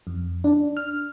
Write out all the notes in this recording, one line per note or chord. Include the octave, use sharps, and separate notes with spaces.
F2
D4
F6